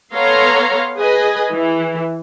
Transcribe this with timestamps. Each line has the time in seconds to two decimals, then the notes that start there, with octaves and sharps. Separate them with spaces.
0.13 B3 A4 C#5 F5 A#5 C6
0.98 G#4 B4 D#5 G#5
1.51 E3